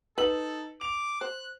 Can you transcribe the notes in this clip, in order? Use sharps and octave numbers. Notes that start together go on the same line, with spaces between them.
D#4 A4 B4 E6 F#7
D6 F7
C5 F#6